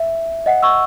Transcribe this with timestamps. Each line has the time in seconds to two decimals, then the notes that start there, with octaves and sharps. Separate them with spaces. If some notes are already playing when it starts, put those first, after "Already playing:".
Already playing: E5
0.46 D#5 F#5
0.63 C#6 E6